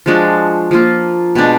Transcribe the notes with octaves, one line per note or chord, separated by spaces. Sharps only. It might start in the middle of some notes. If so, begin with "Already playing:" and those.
F3 G#3 D4 F#4
F3 A#3 F4
B2 G#3 D4